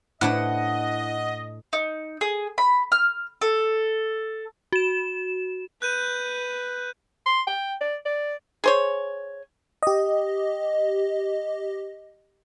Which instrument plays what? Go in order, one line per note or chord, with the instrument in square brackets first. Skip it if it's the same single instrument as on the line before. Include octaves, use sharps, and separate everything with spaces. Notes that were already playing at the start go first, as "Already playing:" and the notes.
[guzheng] A2 D4 B4 [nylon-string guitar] E4 C5 [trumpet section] D#5 [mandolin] F#5
[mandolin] D#4
G#4
B5
F6
A4
[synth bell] F#4 E7
[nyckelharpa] B4 [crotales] F#6 G6 D#7
[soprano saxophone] C6
G5
D5
D5
[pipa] G#4 C5 C#5
[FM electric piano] G4 D#5